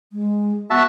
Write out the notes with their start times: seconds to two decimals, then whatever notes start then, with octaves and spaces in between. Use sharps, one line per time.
0.13 G#3
0.70 B3 F#4 E5 A5